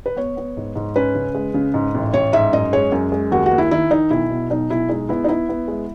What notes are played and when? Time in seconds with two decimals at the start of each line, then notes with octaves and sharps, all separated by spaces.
0.06 B4
0.16 B3 C#5
0.37 B3
0.57 G#2
0.75 G#2
0.96 C#4 B4
1.15 C#3
1.35 G#3
1.54 C#3
1.74 G#2
1.94 A1
2.13 A1 C#5
2.33 G#2 E5
2.53 F#2 D#5
2.73 G#3 C#5
2.92 F#2
3.12 G#3
3.31 D#2 F#4
3.46 F#4
3.51 D#2
3.58 E4
3.71 D#3 E4
3.91 D#3 D#4
4.11 B1 E4
4.30 B2
4.50 B1 D#4
4.70 B1 E4
4.89 G#3 D#4
5.09 B3 E4
5.24 D#4
5.28 B3 E4
5.49 B3
5.68 G#3